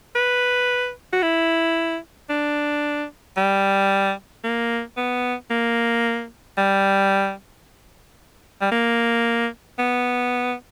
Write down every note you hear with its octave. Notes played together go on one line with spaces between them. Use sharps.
B4
F#4
E4
D4
G3
A#3
B3
A#3
G3
G3
A#3
B3